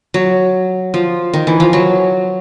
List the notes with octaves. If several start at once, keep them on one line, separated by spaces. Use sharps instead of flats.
F#3
F3
D#3
E3
F3
F#3